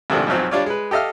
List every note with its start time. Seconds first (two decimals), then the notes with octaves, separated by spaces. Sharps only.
0.10 G#2 C3 D#3 F3 A3 D4
0.27 B1 G#2 F3 F#3 C4
0.51 G3 D4 F4 C#5 D5
0.66 G#3 B4
0.91 G4 A4 D#5 F5 F6